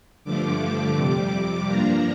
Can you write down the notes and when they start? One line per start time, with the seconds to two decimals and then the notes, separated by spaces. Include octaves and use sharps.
0.24 G2 D3 F3 A3 D6
0.95 F2 C3 G3 D6
1.67 G2 F3 A#3 D4 A#5